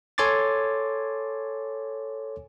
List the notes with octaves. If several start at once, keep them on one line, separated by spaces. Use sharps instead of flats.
A4 C#5 G#5 C6 D6 A6